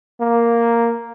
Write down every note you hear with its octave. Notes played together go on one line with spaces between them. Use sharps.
A#3